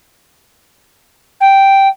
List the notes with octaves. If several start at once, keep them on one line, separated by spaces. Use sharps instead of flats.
G5